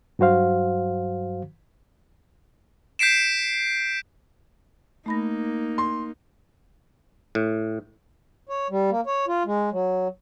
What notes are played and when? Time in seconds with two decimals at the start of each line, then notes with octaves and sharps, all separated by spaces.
0.19 G2 F#3 F#4 C5 F5
2.99 G6 B6 C7 D7 E7
5.06 A3 A#3 D#4 B5 A#6
5.78 C6
7.35 A2
8.49 C#5
8.70 G3
8.91 A#3
9.06 C#5
9.28 F4
9.46 G#3
9.72 F#3